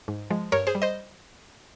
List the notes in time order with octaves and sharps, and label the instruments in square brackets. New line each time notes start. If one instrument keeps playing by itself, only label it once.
[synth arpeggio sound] G#2
F3 G#3
G2 A#4 C#5
G#4 C5
G3
C5 D#5